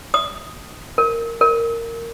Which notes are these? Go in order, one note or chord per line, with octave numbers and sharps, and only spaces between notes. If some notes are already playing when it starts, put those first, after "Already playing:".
D#6
A#4
A#4